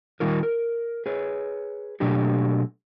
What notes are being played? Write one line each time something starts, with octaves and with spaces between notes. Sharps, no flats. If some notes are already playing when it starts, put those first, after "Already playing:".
D#3 G3 D#4 F4 A#4
A#4
G#4 B4 C#5
B2 F#3 A3 D4 G4